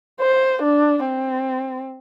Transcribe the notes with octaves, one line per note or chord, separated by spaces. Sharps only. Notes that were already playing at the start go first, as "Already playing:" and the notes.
C5
D4
C4